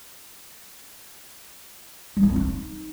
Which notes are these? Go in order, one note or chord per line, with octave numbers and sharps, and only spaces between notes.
G3
E4
C4
D#4